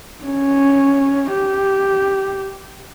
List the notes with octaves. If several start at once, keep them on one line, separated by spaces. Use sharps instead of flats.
C#4
G4